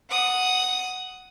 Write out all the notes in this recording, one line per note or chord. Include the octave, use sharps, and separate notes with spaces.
F#5 D#6